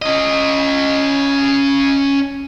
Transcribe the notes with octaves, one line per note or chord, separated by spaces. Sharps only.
C#4 D#5